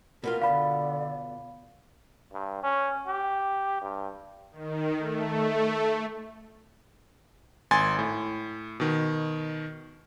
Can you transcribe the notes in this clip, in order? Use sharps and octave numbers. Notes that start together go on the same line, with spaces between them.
B2 B3 F4 A#4
D3 D5 F5 B5
G2
C#4
G4
G2
D#3
A3
G#1 G#5 C6 G#6 A6
A2
B2 D#3